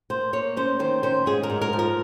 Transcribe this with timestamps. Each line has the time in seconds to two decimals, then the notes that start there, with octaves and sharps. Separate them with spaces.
0.10 A#3 C5
0.33 A#3 C#5
0.57 C#4 C5
0.79 D#3 C5
1.03 C#4 C5
1.26 G#2 G#4
1.43 A#4
1.50 G#2
1.62 A#4
1.73 F3
1.79 A#4